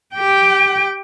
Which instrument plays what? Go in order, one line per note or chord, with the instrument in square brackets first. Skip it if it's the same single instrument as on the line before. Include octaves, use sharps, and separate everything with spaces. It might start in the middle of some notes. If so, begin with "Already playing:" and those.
[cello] G4 G5